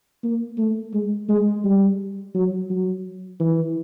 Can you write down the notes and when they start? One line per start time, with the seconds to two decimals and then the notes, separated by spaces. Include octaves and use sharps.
0.24 A#3
0.58 A3
0.94 G#3
1.29 G#3
1.64 G3
2.35 F#3
2.70 F#3
3.40 E3